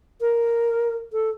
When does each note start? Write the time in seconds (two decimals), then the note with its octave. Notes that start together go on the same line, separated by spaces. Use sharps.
0.21 A#4
1.12 A4